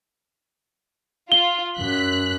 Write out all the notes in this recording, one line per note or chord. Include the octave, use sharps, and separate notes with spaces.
F4 G7
F#2 F#6 B6